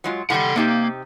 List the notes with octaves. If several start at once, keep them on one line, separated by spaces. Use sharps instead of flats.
F#3 G#3 F4
A2 D#3 G3 A4 F#5
C3 A#3 D#4 G4